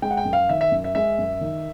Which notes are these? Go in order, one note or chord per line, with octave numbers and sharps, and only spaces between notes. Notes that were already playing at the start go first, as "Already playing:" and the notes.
G#3 G5
F#5
G5
F#2
F5
D#3 E5
E5
F#2
E5
G#3 E5
F#2
D#3